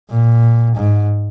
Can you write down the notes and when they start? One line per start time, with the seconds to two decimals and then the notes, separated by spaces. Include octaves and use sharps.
0.10 A#2
0.76 G#2